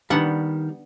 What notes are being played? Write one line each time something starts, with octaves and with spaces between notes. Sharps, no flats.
D#3 G3 B3 D4 F#5